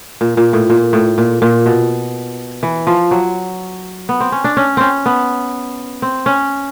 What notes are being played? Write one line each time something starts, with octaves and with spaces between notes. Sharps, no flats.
A#2
A#2
A2
A#2
A2
A#2
A#2
B2
E3
F3
F#3
B3
C4
C#4
D4
C#4
C4 C#4
B3
C4
C#4